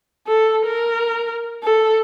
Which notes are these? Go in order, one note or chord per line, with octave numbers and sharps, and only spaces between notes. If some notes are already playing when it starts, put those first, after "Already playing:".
A4
A#4
A4